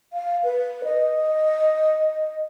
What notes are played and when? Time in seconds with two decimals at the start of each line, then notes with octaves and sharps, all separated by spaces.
0.13 F5
0.44 B4
0.84 D#5